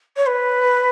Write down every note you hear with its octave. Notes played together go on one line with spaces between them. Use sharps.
C#5
B4